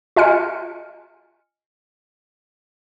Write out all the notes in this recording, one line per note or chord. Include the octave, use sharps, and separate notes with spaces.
F4 D#5 G#5 F6 C#7